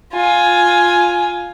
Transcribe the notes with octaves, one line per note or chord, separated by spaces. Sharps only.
F4 G#5